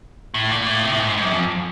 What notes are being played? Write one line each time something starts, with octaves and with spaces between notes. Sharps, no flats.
A2
A#2
A2
C3
A2
G#2
F#2
F2